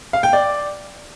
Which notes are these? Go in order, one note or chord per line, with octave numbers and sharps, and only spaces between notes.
F5
G5
D5